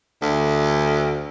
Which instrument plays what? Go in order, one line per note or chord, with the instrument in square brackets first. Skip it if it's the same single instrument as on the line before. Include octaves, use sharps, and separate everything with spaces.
[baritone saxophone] D2